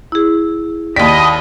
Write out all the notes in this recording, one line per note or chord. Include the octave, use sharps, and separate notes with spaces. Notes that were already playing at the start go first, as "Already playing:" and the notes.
E4 G#4
D#2 D5 D#5 G5 A5 B5 B6